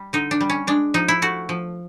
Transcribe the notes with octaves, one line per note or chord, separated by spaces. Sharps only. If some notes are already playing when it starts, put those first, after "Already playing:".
Already playing: G3
D3 D#4
D4
G3
C#4
G#3 D4
F3 D#4
E4
A3 F#4
F3